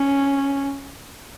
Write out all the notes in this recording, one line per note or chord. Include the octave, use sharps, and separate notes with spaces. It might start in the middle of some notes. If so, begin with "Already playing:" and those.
Already playing: C#4